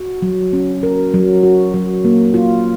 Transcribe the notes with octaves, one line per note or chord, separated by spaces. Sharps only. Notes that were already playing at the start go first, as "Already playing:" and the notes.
Already playing: F#4
F#3
C#4
A#4
F#3
F#4
F#3
A#3
F4